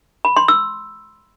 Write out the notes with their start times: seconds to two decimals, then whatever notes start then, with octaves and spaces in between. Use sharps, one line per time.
0.25 B5
0.36 C6
0.48 E6